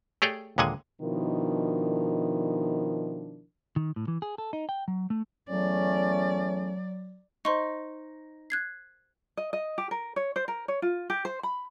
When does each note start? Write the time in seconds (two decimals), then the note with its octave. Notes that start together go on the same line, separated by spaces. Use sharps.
0.22 A3 G4 G#4 C#5 D5 G5
0.58 D#2 A#2 D3 G#3 F#5 G#5
1.01 B2 D#3 F3 D4 E4 A#4
3.76 D#3
3.96 A2
4.08 E3
4.22 G#4
4.38 A4
4.53 D#4
4.69 G5
4.88 F#3
5.10 A3
5.50 E2 F#3 A3 C#4 D5
7.45 D#4 C5 C6 C#6
8.50 F#6 G#6 C7
9.37 D#5
9.53 D#5
9.78 G4
9.91 A#4
10.16 C#5
10.36 C5
10.48 A#4
10.68 C#5
10.82 F4
11.10 G4
11.25 C5
11.43 B5